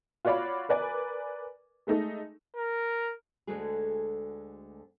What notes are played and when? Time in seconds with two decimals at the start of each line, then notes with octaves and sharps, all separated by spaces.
0.25 F4 F#4 C#5 D5 F5 B5
0.69 A#4 B4 D5 G#5
1.87 G#3 A3 D#4 A4
2.56 A#4
3.47 D2 D3 G#3 A3 F#4 G#4